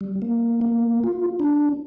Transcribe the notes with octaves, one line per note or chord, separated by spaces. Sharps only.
G3
A#3
A#3
F4
D4